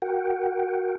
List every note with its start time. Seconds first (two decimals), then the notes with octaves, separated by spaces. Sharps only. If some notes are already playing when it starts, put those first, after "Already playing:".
0.02 F#4 A#4 F#5 G5